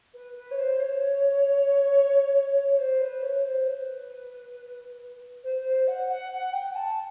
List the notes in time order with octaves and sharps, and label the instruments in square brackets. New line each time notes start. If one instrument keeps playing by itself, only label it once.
[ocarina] B4
B4
C#5
C5
C#5
C#5
C5
B4
C#5
C5
B4
C5
C5
F#5
F#5
F#5
G5
A5